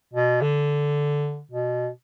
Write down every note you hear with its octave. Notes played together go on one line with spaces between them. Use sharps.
B2
D3
B2